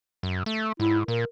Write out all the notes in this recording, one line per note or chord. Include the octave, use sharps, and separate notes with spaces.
F#2
A3
G#2 E4
A#2 A#4